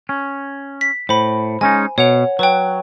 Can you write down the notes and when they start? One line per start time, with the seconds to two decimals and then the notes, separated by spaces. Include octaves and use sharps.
0.09 C#4
0.81 B6
1.09 A2 C5 B5
1.61 G#3 C#4 D#4 G#5
1.98 B2 C#5 F#5 F7
2.39 F#3 B4 C#5 G5